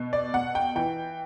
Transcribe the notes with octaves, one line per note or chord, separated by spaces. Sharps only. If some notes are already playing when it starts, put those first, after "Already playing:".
Already playing: B2
D5
B2 F#5
G5
E3 G5